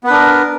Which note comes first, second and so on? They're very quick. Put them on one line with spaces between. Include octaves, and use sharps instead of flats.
B3 B4 D4 A#4